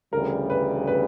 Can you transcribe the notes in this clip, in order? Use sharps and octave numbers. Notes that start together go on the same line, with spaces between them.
D2 C#3 E3 G3 A#4
B4
B4